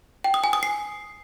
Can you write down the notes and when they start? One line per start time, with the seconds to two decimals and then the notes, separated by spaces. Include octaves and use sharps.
0.24 G5
0.34 D#6
0.44 G#5
0.53 D#6
0.63 C7